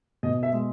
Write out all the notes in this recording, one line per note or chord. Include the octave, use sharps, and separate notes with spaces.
B2 D#5
E5
G#3